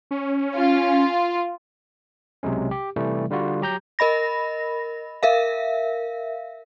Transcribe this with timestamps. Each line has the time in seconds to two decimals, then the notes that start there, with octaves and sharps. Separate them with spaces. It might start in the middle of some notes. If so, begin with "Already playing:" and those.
0.11 C#4
0.55 F4
2.43 B1 C3 F#3 G#3 C#4
2.71 G4
2.96 C3 E3 G3 A3
3.30 D3 G3 F4 F#4
3.61 F#3 G4 A#5 G6
3.99 A#4 D#5 B5 A#6
5.23 A#4 E5 F5